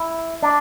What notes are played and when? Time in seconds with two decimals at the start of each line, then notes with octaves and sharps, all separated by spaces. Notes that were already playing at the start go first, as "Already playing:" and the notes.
Already playing: E4
0.42 D4